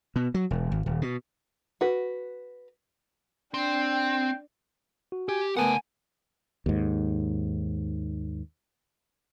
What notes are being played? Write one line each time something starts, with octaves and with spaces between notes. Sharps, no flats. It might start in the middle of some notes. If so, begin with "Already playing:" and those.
B2
F#3
E1
G#1
D#1
B2
F#4 B4
C4 D4 G5
F#4
G4 G#5
A3 B3 A#4 F#5 G#5 A5
D#2 G#2